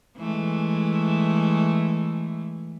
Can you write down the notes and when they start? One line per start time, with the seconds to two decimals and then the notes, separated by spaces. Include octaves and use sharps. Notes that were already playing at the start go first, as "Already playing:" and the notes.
0.17 E3 G#3 A3